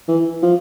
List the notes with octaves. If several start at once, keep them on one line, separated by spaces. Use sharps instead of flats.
E3
F3